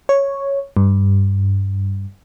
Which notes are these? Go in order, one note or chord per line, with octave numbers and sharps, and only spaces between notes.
C#5
G2